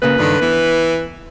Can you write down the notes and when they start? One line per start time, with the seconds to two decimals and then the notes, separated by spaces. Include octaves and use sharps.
0.02 A#2 C#3 A#3 B4
0.18 C#2 G2 D3 D#3
0.41 E3 B3